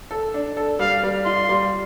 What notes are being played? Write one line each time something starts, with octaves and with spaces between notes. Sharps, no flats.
A4
D4
A4
G3 F5
G3
F4 C6
G3